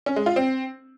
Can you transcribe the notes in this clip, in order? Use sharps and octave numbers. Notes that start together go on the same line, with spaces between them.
C#4
G#3
F4
C4